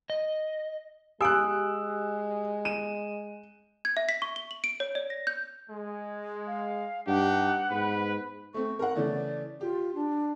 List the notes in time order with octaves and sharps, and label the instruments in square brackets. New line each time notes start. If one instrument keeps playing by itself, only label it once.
[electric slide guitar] D#5
[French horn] G#3 [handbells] G4 D7 [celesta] F5 G#5 D#6 [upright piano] E6 F#6
[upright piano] D#7 E7
[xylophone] G#6
E5
B6
C#6
G7
F#7
D7
C#5
D5
A#6
G6
[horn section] G#3
[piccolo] F5
[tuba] G2 [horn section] D4 D#4 G4 [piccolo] F#5
[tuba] G#2 [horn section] B3 B4
[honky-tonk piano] A3 C4 [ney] C#6
[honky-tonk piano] A#4 F#5
[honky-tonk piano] C#3 E3 A3 [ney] D5
[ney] F4 [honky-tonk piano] G4
[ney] D4